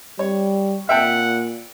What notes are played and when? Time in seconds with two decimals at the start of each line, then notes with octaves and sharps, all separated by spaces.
0.19 G3 C#5
0.89 A#2 E5 F#5 G5 A5